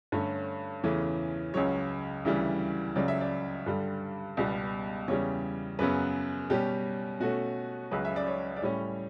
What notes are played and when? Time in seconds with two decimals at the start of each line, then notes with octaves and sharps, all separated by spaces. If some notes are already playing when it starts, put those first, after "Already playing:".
0.12 G2 D3 A3 C#4 C#5
0.83 E2 C#3 E3 A3 C#4
1.54 C#2 C#3 F#3 C#5
2.25 D2 C#3 E3 G3
2.96 C#2 C#3 F#3 D5
3.08 E5
3.21 D5
3.66 G2 D3 G3
4.37 C#2 B2 G3 B3
5.08 E2 C#3 G3 C#5
5.79 F#2 C#3 F#3 B3 B4
6.50 B2 G3 C#4 G4
7.20 B2 A3 C#4 F#4
7.91 C#2 C#3 F#3 B4
8.05 E5
8.16 D5
8.27 C#5
8.57 D5
8.62 A2 G3 C#4 C#5